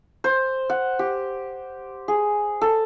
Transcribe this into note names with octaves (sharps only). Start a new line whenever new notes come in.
C5
F#5
G4
G#4
A4